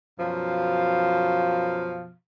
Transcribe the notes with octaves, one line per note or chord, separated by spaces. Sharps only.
F#2 B2 F3 F5